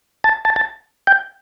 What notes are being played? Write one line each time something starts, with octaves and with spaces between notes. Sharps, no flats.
A5
A5
A5
G5